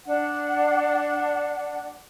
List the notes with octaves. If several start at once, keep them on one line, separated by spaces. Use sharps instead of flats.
D4 F#5